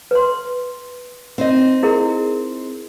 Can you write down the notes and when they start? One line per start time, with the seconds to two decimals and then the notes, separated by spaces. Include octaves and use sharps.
0.11 B4 C6
1.38 C4 D#4 D#5
1.83 E4 G#4 A#4